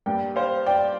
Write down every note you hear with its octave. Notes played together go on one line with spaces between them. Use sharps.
G2 G3 A#3 D5 G5
C5 F5
D5 G5